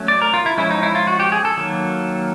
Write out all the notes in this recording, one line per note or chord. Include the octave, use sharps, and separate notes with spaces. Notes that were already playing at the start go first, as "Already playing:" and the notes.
Already playing: F#3 A3 C#4
D5
A#4
F4
E4
F3 G#3 C#4 E4
D#4
E4
F4
F#4
G4
G#4
A4
D#3 F#3 A#3